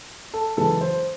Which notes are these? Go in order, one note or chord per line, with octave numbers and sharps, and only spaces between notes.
A4
F#2 C#3 E3 G#3 A4
C5